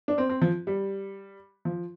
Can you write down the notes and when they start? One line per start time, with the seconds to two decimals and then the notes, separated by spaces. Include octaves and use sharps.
0.08 D4
0.18 C4
0.29 C4
0.42 F3
0.67 G3
1.65 F3